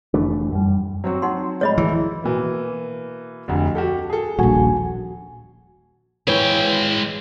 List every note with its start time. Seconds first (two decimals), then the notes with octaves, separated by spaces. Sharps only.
0.14 F1 E3 A3 D4
0.52 F#2 G3
1.04 F#3 C4 F#4
1.22 D#4 F#5 C6
1.61 A2 F#3 G#3 C#5 D#5 B5
1.78 E3
2.24 B2 E3 A#3
3.48 F1 D2
3.75 F#4 G4 A4
4.10 G#4 A4
4.39 D#1 A#1 F#4 G#5
6.27 E3 G#3 F4 C#5 G5